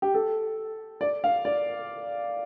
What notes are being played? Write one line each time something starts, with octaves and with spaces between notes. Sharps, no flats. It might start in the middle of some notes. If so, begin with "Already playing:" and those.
G4
A4
D5
F5
D5